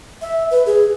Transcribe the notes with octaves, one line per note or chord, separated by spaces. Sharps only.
E5
B4
G#4